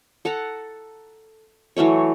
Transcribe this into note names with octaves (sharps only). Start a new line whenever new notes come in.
A4 F#5 A5 A#5
E3 F#3 A3 C#5